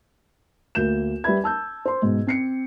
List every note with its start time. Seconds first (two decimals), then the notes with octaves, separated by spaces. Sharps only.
0.75 D2 A#3 G6 E7
1.24 G3 G4 B4 E5 B5 G#6
1.44 A5 E6 G6
1.86 C5 C6
2.02 G#2 B2
2.27 C4 C7 C#7